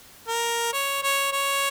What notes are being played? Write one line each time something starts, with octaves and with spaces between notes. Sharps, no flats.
A#4
C#5
C#5
C#5